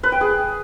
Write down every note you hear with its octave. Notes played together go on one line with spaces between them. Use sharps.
B4
G5
G#4